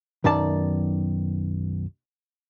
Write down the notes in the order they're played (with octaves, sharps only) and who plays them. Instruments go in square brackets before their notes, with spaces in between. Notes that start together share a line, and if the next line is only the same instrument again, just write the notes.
[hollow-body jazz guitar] B1 F#2 D#3 D5 A5